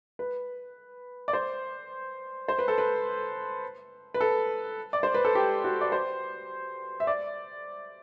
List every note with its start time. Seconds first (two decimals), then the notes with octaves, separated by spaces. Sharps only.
0.19 B4
1.28 D5
1.33 C5
2.48 C5
2.59 B4
2.68 A4
2.78 B4
4.14 B4
4.21 A4
4.93 D5
5.03 C5
5.15 B4
5.25 A4
5.35 G4
5.64 F#4
5.81 D5
5.92 C5
7.00 E5
7.07 D5